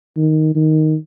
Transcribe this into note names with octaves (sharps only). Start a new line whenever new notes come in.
D#3
D#3